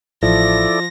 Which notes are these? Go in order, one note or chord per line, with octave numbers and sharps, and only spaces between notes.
A1 F3 E4 A4 D5 A#6